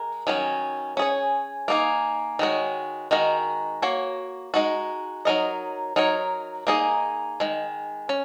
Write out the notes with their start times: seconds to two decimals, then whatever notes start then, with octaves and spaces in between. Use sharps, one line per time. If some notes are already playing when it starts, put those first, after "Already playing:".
Already playing: G#3 A#4
0.27 D#3 F#3 C#4
0.97 C#4 G#4 C#5
1.68 A#3 D#4 G#4
2.39 D#3 G#3 F#4 C#5
3.11 D#3 G#3 D#4 F#4 A#4
3.82 A#3 F#4 C#5
4.54 G#3 D#4 F#4
5.25 F#3 D#4 A#4 D#5
5.96 F#3 D#4 A#4 C#5
6.67 A#3 D#4 G#4 D#5
7.40 D#3 G#3
8.09 C#4